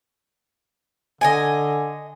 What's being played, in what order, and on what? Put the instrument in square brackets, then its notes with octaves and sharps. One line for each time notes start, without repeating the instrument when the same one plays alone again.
[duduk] D3 [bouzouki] D#5 G5 G#5